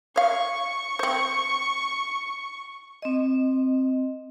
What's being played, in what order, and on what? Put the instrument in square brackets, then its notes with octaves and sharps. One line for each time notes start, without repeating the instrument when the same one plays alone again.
[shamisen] C#5 F5 [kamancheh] C#6
[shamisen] C4 C5
[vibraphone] C4 D#5